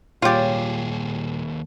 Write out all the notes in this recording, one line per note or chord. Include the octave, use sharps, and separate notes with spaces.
D#2 A#2 G3 F4 G4 G#4 C#5 D5